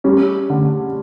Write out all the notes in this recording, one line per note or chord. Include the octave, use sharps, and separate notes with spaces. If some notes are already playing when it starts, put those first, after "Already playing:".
G3 C#4
D3